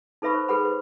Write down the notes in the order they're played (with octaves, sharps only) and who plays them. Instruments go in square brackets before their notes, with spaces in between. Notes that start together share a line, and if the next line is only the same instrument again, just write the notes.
[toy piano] D#4 A4 B4 E5 B5 C#6
C5
G#4 A4 B4 F#5 B5
B4